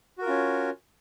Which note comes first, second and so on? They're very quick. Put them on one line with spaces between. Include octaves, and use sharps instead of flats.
F#4 A#4 F4 C#4